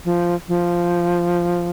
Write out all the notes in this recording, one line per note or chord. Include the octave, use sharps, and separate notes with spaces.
F3
F3